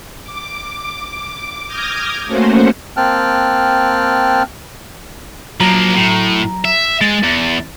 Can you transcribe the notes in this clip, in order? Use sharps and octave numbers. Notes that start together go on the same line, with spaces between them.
D6
D6 D#6 F6 G6 G#6 A#6
A3 A#3 C#4 F#4 C5 F#5
A#3 C4 G5 A5 F6 F#6
F3 F#3 A#3 A#5
A2
E5
G#3 A6
E2